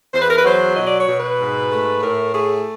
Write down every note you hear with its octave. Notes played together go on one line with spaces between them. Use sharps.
E2 C5
B4
A#4
B4
F#3 C5
B2 D#5
D5
C#5
B2
B4
G#2
A3
A2 A#4
A3 G#4